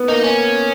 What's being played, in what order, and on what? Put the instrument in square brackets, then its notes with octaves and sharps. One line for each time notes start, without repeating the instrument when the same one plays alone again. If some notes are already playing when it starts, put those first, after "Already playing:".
Already playing: [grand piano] B3
[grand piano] A#3 [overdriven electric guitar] D#4
[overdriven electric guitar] C#4